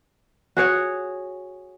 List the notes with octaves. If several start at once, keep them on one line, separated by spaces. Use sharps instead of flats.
F#4 G#4 C#5 F#5